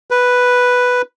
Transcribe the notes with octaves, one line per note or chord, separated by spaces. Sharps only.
B4